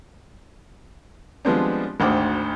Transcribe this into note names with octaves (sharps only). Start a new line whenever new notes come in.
F3 G3 G#3 B3 C4 D4
G#1 D2 C5 F#5 G5 D6